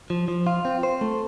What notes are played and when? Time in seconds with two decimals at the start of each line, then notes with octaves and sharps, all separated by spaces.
0.10 F3
0.28 F3
0.47 F4
0.65 C4
0.83 C5
1.01 A3